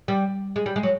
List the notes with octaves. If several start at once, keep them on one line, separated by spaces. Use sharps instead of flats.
G3
G#3
G3
G#3
F#3